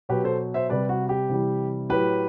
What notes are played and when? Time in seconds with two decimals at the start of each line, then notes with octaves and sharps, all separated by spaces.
0.09 B2 F#3 G4 B4
0.24 A4 C5
0.54 C5 E5
0.69 C3 G3 B4 D5
0.89 F#4
1.09 G4
1.29 C3 E3 G3
1.90 A2 F#3 G4 B4